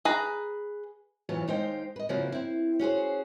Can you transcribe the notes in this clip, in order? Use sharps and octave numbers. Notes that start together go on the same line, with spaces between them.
G#4 B4 A#5
F2 A#2 E3 F#3 C#5 A5
D#2 G#3 D#4 C5 F5 G5
B4 D#5
C#3 F3 A#3 C4 E4 F#4
C4 E4
C#4 F#4 G#4 C5